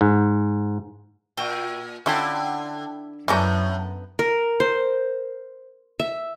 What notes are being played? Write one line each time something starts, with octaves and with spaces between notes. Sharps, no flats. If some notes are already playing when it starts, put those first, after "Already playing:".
G#2
A#2 E4 F#4 G5
D3 C#4 E4 F4 G5 B5
F#2 A2 E3 B3 C#4 D4 A#5 G6
A#4
C5
E5